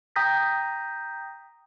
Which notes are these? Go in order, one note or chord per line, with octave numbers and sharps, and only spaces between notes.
G5 A#5 D#6 G6 A#6 B6